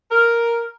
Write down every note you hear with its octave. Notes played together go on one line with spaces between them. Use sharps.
A#4